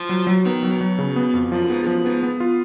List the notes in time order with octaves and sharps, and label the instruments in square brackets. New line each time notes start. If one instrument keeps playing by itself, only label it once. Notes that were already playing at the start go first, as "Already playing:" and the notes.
Already playing: [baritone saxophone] F3
[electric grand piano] F#3
F#3
[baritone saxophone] D#3 [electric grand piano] B3
[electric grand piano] F#3
[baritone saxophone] B2
[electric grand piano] F#3
C#3
B3
F2
[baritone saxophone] F#2 [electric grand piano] F3
[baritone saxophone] G#2 [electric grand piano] B3
[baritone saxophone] G#2
[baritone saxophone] F#2 [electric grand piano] F3
[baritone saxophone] G#2 [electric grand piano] B3
[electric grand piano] B3
F4